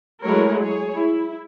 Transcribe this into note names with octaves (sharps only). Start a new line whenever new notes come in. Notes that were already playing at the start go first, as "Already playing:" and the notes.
F#3 G#3 A3 E4 A#4 C#5
G#4 C#5
E4